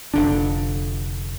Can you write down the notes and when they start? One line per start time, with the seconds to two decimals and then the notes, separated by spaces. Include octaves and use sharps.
0.14 F1 D3 D4